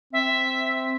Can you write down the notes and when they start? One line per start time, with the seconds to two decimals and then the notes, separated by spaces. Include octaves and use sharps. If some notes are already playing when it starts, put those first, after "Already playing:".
0.13 C4 E5